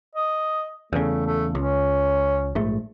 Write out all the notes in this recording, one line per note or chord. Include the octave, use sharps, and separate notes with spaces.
D#5
E2 C#3 A3
A3
C#2 C#4
A#1 G#2 A3